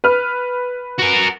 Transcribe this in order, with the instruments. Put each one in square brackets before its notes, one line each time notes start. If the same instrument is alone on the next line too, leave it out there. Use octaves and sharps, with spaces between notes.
[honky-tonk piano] B4 F6
[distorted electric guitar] F#4 A#4